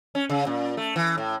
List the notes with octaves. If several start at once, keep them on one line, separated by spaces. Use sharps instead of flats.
C#4
C#3
A#2
A3
E3
A2